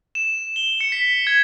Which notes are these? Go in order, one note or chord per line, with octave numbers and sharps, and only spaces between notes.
E7
G7
C#7
B6
G#6